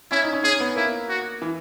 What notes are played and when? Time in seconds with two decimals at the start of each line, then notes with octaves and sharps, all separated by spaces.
0.11 C#4 E4
0.23 D#4
0.33 C#4
0.44 C#4 G#4
0.60 B3
0.76 A#3 E4
1.09 F#4
1.42 E3